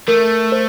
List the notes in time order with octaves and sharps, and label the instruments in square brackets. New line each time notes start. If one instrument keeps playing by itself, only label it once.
[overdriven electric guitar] A3 [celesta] A#4
[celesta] C5